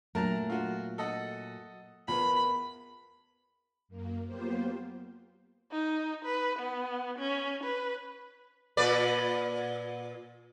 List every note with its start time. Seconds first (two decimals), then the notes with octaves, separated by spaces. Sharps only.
0.15 A#2 F#3 A3 A#4 A5 A#5
0.50 F4 F#4
0.98 A4 D#5 F#5
2.08 E2 F4 A#4 B4 B5
3.88 F#2 A#3
4.27 F#3 A#3 B3 F4 G4 C5
5.72 D#4
6.25 B4
6.59 B3
7.19 C#4
7.64 B4
8.77 A#2 B4 D5